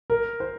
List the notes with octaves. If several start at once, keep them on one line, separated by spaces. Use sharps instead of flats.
A#4
C5